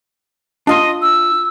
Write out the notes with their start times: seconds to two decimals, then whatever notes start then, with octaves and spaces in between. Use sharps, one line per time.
0.67 D4 F4 D#5 C6
1.02 E6